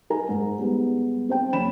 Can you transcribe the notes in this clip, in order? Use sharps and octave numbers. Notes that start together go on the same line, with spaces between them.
D#4 A#4 G#5 A#5
G#2
G3 G#3 B3
C4 C5 G5
F#1 C4 C#4 B5 E7